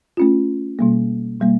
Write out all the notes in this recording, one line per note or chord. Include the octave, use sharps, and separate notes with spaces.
A3 C#4 F4
B2 G3 A#3
B2 G3 A#3